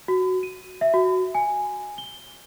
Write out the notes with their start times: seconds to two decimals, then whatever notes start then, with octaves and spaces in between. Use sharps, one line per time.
0.08 F#4
0.43 D#7
0.81 E5
0.94 F#4
1.35 G#5
1.98 G7